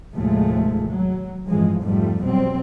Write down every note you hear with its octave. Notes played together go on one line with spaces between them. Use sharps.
D#2 A2 C3 F3 G#3 A3
F#3
A1 G2 E3 F3 G#3
F2 G#2 F3 G3 A3
B2 F#3 G3 C4